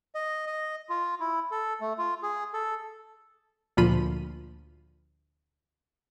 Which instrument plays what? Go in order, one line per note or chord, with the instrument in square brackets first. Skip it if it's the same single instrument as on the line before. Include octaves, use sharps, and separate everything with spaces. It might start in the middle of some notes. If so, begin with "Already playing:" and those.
[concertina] D#5
D#5
F4
E4
A4
A3
F4
G#4
A4
[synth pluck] D2 A#2 F3 F4 B5 D#7